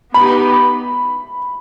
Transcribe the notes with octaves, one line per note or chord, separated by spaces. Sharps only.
B3 D#4 G4 B5